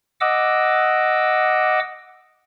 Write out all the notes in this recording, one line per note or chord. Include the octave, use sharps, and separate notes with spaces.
D#5 F#5 D6 E6